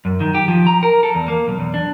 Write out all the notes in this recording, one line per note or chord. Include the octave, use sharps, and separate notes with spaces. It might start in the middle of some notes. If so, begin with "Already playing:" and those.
F#2
D#3
G4
F3
A#5
A#4
A4
E2
A#3
B1
E2
D4